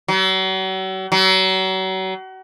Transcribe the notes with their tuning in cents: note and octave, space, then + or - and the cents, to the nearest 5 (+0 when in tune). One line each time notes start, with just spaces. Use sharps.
F#3 +40
F#3 +35